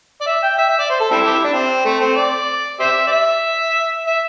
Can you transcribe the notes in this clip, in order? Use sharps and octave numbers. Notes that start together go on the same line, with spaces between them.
D5
E5
G5
E5
E5
D5
C5
A4
G3 C4 E4
G4
E4
D4
C4
A3
C4
D5
G4 C5 E5
D5
E5
E5